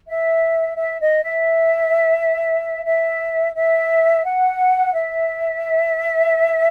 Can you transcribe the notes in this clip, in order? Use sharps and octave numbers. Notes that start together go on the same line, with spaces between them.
E5
E5
D#5
E5
E5
E5
F#5
E5